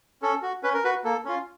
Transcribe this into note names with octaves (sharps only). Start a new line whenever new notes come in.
C#4 A4
F#4
C#4 B4
A#4
F#4 B4
A#3 A4
C#4 F4